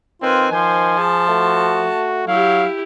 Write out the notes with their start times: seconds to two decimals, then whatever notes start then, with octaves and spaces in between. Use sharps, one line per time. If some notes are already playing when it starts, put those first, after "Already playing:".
0.22 D#3 C4 F4 B4 G#5
0.52 F3 C5 G#5
0.98 G#4 A5
1.29 A3 F#4
2.28 F#3 E4 G4 F5